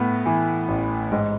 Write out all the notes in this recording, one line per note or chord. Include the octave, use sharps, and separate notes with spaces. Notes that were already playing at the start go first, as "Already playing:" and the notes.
Already playing: A2 B3
E3
A1
G#2